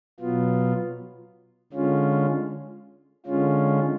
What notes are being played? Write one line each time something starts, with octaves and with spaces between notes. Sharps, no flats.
B2 F#3 B3 F4
D3 G#3 C#4 F4
D3 G#3 C#4 F4